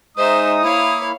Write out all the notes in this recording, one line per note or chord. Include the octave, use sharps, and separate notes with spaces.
G#3 D#4 C5 E5 D#6
A#3 E4 C#5 F5